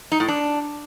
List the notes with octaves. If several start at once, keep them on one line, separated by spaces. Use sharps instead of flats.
D#4
A2
D4